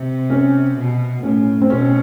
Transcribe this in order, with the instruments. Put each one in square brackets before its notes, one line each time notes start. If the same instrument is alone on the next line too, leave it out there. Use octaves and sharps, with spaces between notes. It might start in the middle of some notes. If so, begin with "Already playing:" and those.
Already playing: [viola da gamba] C3
[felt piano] C#4
[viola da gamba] B2
[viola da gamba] A2 [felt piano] C#4
[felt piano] C4
[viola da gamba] B2 [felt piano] C#4